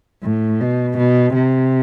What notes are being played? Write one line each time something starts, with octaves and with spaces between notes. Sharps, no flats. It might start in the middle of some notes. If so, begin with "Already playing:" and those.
A2
B2
B2
C3